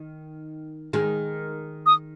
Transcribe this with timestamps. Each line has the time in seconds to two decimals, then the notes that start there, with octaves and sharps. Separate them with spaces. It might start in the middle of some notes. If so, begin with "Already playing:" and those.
Already playing: D#3
0.93 D#3 G#3
1.86 D#6